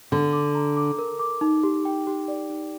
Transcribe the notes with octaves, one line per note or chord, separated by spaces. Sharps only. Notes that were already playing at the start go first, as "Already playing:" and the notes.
D3 D6
D6
A#5
D6
A#4
D6
D#4
G4
G5
G4
D5
D#4